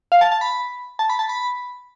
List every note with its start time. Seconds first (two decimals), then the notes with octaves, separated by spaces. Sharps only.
0.12 F5
0.21 A5
0.32 A5
0.41 B5
0.99 A5
1.10 B5
1.19 A5
1.29 B5